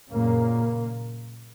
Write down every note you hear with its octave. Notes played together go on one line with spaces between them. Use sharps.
F#2 A#2 C#3 A#3